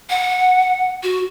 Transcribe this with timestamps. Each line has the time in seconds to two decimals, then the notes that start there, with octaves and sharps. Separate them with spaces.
0.10 F#5
1.03 F#4